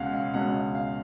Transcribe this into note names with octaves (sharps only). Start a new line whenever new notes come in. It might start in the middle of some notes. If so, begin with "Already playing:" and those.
Already playing: C#2 B2 G#3 C#4 F5 F#5
F5
C#2 B2 G#3 C#4 F#5
F5
F5